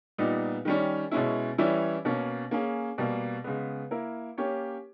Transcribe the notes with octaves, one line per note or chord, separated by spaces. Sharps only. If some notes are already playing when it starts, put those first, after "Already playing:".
A#2 G3 B3 D#4
D#3 G3 C#4
B2 G#3 C#4 E4
E3 G3 C#4 E4
B2 A#3 C#4
A#3 C#4 G#4
B2 G3 A#3
C#3 G#3 B3
A#3 E4 A#4
A#3 C#4 G4 C#5